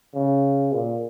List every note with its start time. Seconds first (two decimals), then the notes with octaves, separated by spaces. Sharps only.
0.14 C#3
0.73 A#2